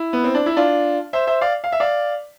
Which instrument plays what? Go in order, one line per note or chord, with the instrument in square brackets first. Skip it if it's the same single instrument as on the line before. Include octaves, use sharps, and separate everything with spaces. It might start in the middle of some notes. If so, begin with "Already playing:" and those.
Already playing: [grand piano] E4
B3
C4
D4
E4
D4 F4
C5 E5
C5 E5
D5 F5
F5
E5
D5 F5